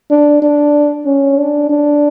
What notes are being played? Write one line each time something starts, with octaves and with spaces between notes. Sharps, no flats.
D4
D4
C#4
D4
D4